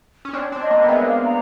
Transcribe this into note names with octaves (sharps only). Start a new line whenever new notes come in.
C#4
C4 D4 C#5
C4 D4
D#5
A#3 C4
B3 D#5
G#3 A#3 E5
F5
A#5